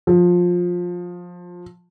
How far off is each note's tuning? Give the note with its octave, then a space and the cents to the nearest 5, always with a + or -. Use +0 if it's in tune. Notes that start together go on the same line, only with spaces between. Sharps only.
F3 +20